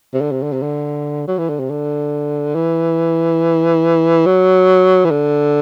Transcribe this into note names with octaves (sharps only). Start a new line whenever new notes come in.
C3
D3
C3
D3
C3
D3
F#3
E3
D3
C3
D3
E3
F#3
E3
D3